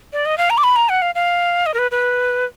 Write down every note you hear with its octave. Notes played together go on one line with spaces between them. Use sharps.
D5
D#5
F5
A#5
D6
B5
A#5
F#5
F5
F5
D#5
A#4
B4
B4